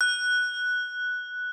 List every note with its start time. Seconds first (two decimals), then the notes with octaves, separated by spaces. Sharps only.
0.01 F#6